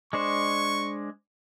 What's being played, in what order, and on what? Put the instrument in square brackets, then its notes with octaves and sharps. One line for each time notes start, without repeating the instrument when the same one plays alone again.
[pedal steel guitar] G#3 D4 C5 [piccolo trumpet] C#6